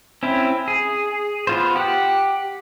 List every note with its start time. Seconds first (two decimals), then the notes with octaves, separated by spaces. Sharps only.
0.23 C4 C#4 E4
0.68 G#4
1.47 B3 F4 C5
1.76 G4 F#5